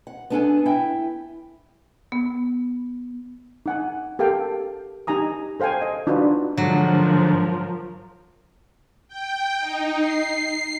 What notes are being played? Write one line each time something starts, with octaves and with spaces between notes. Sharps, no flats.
F#5
B3 D4 A4 G#5
E4 E5 G5
B3
D#4 F#5 G#5
G4 A4 A#4 F5 G5
D#4 G4 G#5 A#5 D#6
A4 C5 F5 G5 G#5
D#5
D4 D#4 F4 F#4 B4
G#2 D3 F3 F#3 A#4
G5
D#4
C7